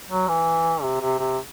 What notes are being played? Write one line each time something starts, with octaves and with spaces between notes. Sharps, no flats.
F#3
E3
C3
C3
C3